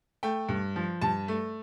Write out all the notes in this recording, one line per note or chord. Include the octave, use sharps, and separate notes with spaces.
A3 G5
G2
F3
G2 A5
A3